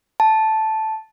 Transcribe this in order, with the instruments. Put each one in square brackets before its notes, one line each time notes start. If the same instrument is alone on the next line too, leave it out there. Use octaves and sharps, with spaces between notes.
[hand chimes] A5